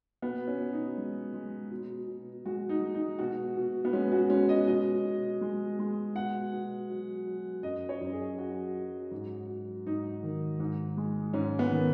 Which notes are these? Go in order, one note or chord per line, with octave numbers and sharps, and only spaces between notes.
B2 B3
C#4
B2
D#4
G#3
G#3
B2
B2
G#3 F#4
D#4
G#3
D#4
B2 F#4
B2
B3
G#3 C#4
F#4
G#3 C#4
D#5
B2 D#5
B2
G#3
G#3
B2 F#5
B2
F#3
F#3
F#2 D#5
C#5
F#2
G#4
F#3 F#4
F#3
G#2
F#3
G#2 D#4
D#3
G#2
G#3
G#2 C#4
B3
D#3